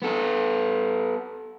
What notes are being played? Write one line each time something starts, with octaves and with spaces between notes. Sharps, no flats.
B3 A4